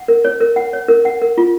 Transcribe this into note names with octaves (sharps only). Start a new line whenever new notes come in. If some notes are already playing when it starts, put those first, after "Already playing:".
Already playing: F#5
A#4
C#5
A#4
F#5
C#5
A#4
F#5
A#4
F4